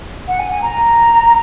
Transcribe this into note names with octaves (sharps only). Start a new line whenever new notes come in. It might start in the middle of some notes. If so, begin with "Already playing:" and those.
F#5
G#5
G#5
A#5